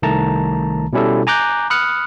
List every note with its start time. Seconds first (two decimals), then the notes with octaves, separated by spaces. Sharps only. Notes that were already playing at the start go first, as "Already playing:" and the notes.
0.02 C2 D#3 A3 A5 A#5
0.93 B2 G3 C#4 E4 G4 A4
1.27 G#5 A#5 D6 F#6 G6
1.70 B5 D#6 F6 F#6 C#7